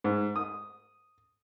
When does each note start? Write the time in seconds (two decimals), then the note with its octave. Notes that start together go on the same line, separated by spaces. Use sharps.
0.04 G#2
0.36 D#6